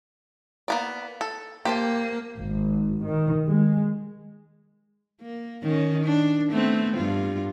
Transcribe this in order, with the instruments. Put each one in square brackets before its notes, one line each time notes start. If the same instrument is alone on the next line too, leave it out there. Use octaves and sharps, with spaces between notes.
[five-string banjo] A#3 B3 D5
A4
[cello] A#3 [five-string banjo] G4 C5 A5
[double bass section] G#1
D#3
G#3
[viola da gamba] A#3
D#3 C#4
D4
A3 B3 C4
G2 F4